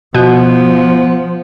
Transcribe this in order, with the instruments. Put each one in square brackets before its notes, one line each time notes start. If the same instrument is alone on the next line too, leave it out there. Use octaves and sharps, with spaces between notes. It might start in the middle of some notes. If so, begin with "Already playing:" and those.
[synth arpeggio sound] B2 [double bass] F3 [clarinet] B3